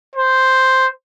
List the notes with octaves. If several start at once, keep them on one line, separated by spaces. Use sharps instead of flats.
C5